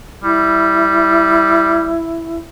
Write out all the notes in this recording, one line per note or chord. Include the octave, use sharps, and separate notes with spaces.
G3 E4